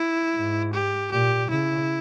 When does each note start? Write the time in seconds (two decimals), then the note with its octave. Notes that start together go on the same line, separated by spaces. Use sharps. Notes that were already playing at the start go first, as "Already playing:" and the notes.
Already playing: E4
0.35 G#2
0.73 G4
1.12 A#2 G4
1.49 C#3 E4